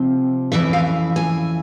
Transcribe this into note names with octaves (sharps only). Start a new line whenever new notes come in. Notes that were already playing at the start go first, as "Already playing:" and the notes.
Already playing: C3 F3 C4
F2 C#3 E3 E4 E5
F5
G#5